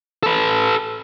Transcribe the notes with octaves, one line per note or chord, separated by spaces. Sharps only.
A4 B4